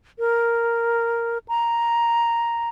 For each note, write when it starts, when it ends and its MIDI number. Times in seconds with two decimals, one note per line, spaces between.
0.19 1.38 70
1.48 2.69 82